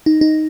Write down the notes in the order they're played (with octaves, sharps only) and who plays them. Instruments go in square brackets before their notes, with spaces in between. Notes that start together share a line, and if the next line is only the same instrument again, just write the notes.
[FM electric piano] D#4
D#4